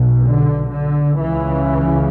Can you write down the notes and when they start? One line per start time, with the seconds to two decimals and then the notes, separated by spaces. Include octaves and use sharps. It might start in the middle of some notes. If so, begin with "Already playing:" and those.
Already playing: B1 B2
0.21 D3
0.71 D3
1.19 C#2 C#3 E3